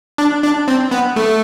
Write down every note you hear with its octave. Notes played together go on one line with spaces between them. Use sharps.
D4
D4
C4
B3
A3